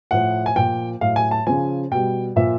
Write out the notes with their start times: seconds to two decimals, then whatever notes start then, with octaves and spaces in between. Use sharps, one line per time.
0.11 A2 F3 F#5
0.46 G#5
0.56 A#2 F3 G5
1.01 A2 F#3 F5
1.16 G#5
1.31 A5
1.47 C#3 F3 G#5
1.91 B2 G3 G5
2.36 A#2 F3 E5